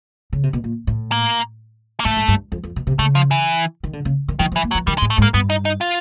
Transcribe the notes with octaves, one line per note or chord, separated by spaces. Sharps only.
C#3
C3
B2
A#2
A2
A#3
A#3
A2 A3
G#2
G2
F2
F2
B2
C3
C#3 A3
F3
E3
D#3
D3
C#3
D#3
D#3 E3
F3
E3
A#3
F#3
E3
D#3 G3
G#3
A2
A3
G#2
A#3
G2 B3
D#4
D#4
F4